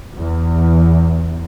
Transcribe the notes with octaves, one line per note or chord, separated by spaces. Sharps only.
E2